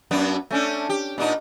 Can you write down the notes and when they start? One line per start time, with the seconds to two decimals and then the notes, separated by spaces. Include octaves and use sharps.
0.11 F#2 B3 D4
0.51 A3 C#4 D4
0.89 G4
1.18 A#2 D4 D#4